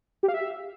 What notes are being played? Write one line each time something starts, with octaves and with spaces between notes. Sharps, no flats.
G4
F5
E5